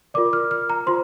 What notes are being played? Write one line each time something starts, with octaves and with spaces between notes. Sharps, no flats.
F4 A#4 D5 D6
F6
F6
A#5
F4 C5 C6